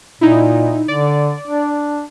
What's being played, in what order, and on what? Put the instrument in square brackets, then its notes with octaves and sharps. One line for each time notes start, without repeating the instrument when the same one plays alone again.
[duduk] A#2 [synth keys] D#4 E4
[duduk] D3 [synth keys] D5
[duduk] D4